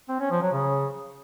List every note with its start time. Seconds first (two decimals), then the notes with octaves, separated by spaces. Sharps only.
0.09 C4
0.20 C#4
0.31 F3
0.42 F#3
0.53 C#3